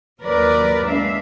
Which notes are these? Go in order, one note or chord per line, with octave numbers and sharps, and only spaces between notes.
D#2 F#3 A#4 B4 D5
G#3 D4 E5 F5